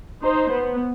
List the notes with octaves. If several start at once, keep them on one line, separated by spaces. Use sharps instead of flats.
D#4 C5
B3